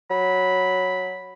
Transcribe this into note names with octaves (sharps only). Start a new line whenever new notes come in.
F#3 B5